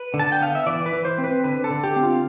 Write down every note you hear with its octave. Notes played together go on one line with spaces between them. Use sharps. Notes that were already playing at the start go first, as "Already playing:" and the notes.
Already playing: B4
D3
A5
G5
B3 F5
E5
E3 D5
B4
E3
C5
C4
B4
D3 B4
A4
D3
G4
C4
F4